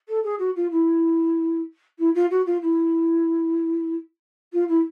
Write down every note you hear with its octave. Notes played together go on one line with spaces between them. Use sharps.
A4
G#4
F#4
F4
E4
E4
F4
F#4
F4
E4
F4
E4